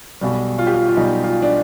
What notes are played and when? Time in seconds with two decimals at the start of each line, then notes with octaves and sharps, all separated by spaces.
0.21 B1 B2 G3
0.59 F4
0.67 G4
0.74 F4
0.89 F4
0.97 B1 B2 G3 D#4
1.24 F4
1.42 D4